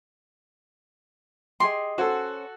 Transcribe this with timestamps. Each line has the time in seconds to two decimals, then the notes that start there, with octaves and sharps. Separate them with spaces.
1.60 G4 G#4 D#5 C6
1.98 C#4 F#4 A4 C5